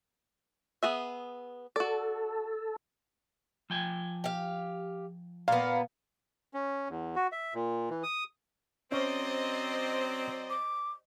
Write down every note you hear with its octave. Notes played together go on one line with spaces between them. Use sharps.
B3 G#4 E5
F#4 A4 D5
F3 G5 G#5
G4 F5
A#2 B3 F5
C#4
E2
F#4
E5
A#2
E3
D#6
F#3 C4 C#4 C5 D5 D#5
D6